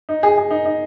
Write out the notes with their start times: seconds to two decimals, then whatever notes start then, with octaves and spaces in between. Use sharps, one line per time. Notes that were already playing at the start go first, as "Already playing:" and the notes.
0.09 D#4
0.23 G#4
0.37 G#4
0.51 D#4
0.65 D#4